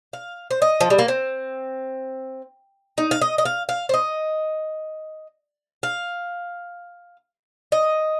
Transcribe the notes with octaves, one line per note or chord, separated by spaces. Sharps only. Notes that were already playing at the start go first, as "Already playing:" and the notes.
F5
C5
D#5
F3
G3
A#3
C4
D#4
F5
D#5
D#5
F5
F5
C5
D#5
F5
D#5